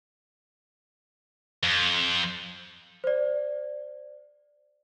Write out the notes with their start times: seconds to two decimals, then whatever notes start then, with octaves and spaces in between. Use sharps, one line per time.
1.63 F2
3.04 C5 D5